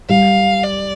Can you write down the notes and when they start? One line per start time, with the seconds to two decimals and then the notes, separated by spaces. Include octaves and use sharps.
0.09 G3 F5
0.63 D5